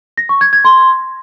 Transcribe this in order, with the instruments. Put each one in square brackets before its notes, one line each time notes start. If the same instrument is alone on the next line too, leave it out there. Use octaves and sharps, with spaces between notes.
[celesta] A#6
C#6
G#6
G#6
C6